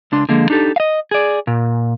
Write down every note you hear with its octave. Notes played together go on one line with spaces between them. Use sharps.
C#2 D4 C6
D3 F3 G#3 A#3
D4 D#4 G4 A4
D#5 F5
G#4 D5
A#2